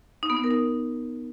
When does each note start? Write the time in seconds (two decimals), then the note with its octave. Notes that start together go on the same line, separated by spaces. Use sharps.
0.23 D#4
0.30 B3
0.37 D#4
0.44 A#4
0.51 D#4